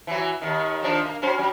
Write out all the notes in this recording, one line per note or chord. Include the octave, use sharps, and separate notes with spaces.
E3 F#3
D#2 D#3
D#3 F3 D4
A#3
F#3 C#4 C5
F#3